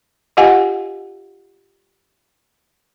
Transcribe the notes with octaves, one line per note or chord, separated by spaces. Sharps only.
F4 G4 D#5 F5 F#5 G#5